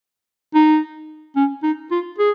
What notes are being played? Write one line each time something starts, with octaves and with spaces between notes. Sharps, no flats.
D#4
C#4
D#4
F4
G#4